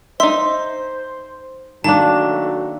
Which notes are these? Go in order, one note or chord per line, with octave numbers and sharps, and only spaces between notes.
D#4 C5 E5 C6
B1 D#3 F#3 A3 A#3 D4 A5